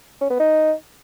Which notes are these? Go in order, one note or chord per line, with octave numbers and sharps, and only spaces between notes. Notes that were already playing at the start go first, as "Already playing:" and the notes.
C#4
B3
D#4